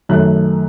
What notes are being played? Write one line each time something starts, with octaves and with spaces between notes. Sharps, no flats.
F#2 D#3 A3 F#6